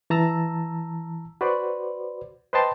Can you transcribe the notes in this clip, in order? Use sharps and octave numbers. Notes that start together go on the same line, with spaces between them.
E3 A5 A#5 E6
F#4 B4 C5 D5
B4 C5 D#5 G5 A5 C6